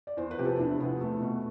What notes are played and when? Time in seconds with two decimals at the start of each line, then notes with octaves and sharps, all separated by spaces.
0.07 D5
0.17 E2 C5
0.31 B4
0.39 C3 F3 G4
0.45 A4
0.56 E4
0.59 E2 D4
0.80 C3 F3 B3
1.01 E2 A3
1.22 B2